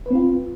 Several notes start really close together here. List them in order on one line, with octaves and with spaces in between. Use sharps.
B4 C4 F4